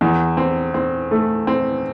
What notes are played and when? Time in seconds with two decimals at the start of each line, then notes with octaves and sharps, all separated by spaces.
0.01 E2
0.37 C4
0.74 C4
1.11 A3
1.47 C4